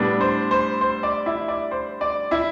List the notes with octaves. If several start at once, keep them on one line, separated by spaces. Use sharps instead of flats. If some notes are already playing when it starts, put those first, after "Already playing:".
Already playing: A2 G3 B3 D4
C5
C5
C5
D5
E4 E5
D5
C5
D5
E4 E5